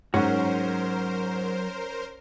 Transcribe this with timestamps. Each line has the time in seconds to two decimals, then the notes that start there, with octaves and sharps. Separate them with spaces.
0.14 G#2 F#3 C#4 F#4 A#4 C5